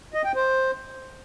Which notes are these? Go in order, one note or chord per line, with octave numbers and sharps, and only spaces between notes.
D#5
G5
C5